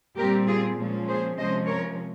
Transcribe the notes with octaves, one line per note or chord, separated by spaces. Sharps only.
A#2 G3 C4 G4 A#4
F4 G#4
A#2 F3 G#3 C#4
G#4 C5
C3 F3 G#3 C#4 C5 D#5
A#4 C#5